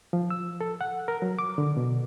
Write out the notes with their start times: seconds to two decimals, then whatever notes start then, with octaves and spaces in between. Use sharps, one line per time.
0.13 F3
0.30 E6
0.61 A4
0.81 F#5
1.08 A#4
1.22 F#3
1.39 D6
1.58 D3
1.77 B2